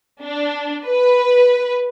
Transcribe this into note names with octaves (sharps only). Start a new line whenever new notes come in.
D4
B4